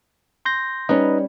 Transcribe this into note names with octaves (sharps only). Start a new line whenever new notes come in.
C6 G6 A#6
G3 C#4 D#4 B4 D#5